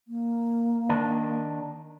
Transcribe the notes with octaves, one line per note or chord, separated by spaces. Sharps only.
A#3
D#3 D4